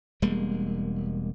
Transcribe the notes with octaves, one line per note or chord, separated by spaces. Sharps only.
E1 G3 G#3 A#3